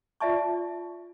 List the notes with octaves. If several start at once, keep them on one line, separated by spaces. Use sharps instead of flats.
F4 D5 E5 A5 C#6